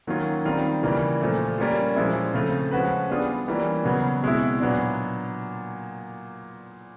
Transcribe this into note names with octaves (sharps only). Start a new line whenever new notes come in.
D#3 F#3 A#3 C#4 F4
D#3 G3 C4 F4 A#4
C#3 E3 G3 A#3
A#2 F3 A3
G3 A#3 C#4 F4
A#2 F3 G#3 C#4 E4
C#3 F3 A3 C4 F4
F3 G#3 C#4 F#4 B4
G3 B3 D4 F4 G#4
E3 G3 A#3 C#4
C#3 F#3 B3
B2 G#3 C4 E4
A#2 F#3 B3 D4